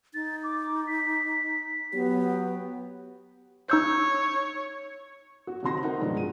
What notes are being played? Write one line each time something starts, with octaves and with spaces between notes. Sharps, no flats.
D#4 A6
D6
B6
F#3 B3 G4
D#4 C#5 E6 G6
F#4
D#1 C4 D#4 F#4 C6 A#6
C4 D#4 E4 A4 A#4 F#5
G2 B2 D#3 F3 G#3 D4
G#4 D#7